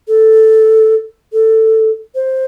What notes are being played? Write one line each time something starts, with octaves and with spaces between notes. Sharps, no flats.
A4
A4
C5